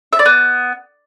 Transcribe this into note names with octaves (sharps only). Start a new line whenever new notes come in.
E5
D5
B3